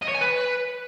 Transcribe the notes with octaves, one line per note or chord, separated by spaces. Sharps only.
D#5
C#5
G#5
B4